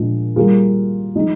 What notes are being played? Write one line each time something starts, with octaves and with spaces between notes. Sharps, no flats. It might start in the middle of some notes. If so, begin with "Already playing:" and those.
Already playing: A#2 F3 G#3 D4
G3 A#3 F4 G#4
F3 G#3 D#4